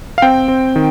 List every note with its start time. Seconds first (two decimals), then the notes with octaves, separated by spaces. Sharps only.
0.18 F5
0.22 C4 G5
0.48 C4
0.76 D#3